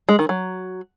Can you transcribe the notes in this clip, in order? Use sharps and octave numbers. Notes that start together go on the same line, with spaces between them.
G#3
D#3
F#3